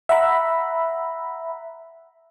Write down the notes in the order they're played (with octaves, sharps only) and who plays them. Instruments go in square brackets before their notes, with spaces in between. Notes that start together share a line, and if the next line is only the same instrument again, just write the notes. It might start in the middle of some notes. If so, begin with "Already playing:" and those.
[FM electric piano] E5 F#5 A#5 B5